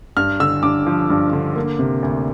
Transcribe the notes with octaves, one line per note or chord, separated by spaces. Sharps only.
G2 F6
D3 E6
G2 D6
F3
G2
D3
A#3
C3
D2